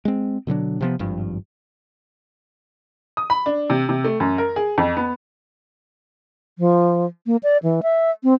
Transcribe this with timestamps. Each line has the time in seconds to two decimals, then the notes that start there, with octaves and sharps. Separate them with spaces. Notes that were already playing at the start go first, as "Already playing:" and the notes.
0.05 G#3 C4
0.47 B2 D3 F#3 D4
0.81 C3 F3 B3
0.99 G#1 G2 F3
3.17 D#6
3.30 B5
3.46 D4
3.70 C3
3.89 C3
4.04 A3
4.20 F#2
4.38 A#4
4.56 G#4
4.78 F2
4.97 B3
6.59 F3
7.26 A#3
7.43 D5
7.63 E3
7.83 E5
8.23 C4